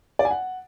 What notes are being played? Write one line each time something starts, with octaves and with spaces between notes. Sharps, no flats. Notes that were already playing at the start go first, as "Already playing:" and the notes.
D5
G#5
F#5